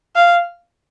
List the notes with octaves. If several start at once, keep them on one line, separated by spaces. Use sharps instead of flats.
F5